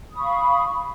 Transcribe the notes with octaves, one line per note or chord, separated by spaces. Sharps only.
F5 B5 C#6 D#6